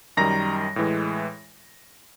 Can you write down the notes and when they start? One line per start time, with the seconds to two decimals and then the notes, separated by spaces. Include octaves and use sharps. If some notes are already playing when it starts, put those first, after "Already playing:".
0.17 F#2 D#3 G3 A#5 A#6
0.76 A2 E3 G#3